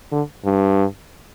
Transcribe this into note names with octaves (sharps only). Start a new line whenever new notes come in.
D3
G2